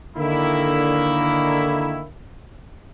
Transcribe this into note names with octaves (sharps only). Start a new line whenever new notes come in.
D3 D#3 A#3 E4